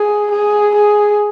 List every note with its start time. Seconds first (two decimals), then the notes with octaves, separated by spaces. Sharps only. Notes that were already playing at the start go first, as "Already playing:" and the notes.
Already playing: G#4
0.31 G#4
0.75 G#4